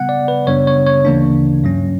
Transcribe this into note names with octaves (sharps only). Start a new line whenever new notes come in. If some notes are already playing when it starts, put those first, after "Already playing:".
Already playing: C#3 G3 B3 F#5
D5
B4
F#2 C#3 G3 B3 D4 C#5
C#5
C#5
D2 C#3 E3 A#3 D4
G2 F#3 C#4